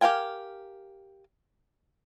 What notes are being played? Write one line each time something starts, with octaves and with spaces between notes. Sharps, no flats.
G4 A#4 F5 G5 G#5